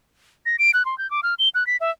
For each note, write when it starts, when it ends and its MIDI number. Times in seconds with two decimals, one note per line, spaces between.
0.46 0.56 94
0.59 0.71 98
0.74 0.85 90
0.85 0.97 84
0.98 1.09 91
1.11 1.21 86
1.23 1.34 89
1.39 1.49 103
1.55 1.66 90
1.67 1.77 95
1.80 1.91 76